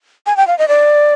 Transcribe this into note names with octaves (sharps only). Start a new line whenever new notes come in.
G#5
G5
F5
D#5
D5